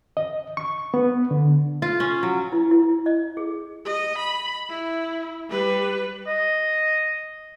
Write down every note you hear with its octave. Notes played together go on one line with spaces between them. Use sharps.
D#5
C#6
B3
D3
F4
C#4
F#3
E4
E4
D#5
G#4
D#5
B5
E4
G3 B4
D#5